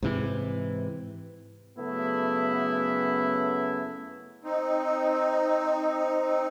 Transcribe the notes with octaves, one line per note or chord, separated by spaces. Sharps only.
G#2 C3 E3
F#2 C#3 A3 B3 E4
C4 D#4